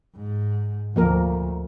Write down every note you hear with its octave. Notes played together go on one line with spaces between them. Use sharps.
G#2
D2 F3 A#3 A#4